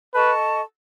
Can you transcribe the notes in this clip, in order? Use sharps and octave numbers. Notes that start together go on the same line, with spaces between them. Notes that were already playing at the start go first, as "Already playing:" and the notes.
A4 B4 D#5 A5 C#6